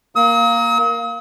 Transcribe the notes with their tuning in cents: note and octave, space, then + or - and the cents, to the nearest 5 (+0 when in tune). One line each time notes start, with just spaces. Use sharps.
A#3 +0 D#6 +45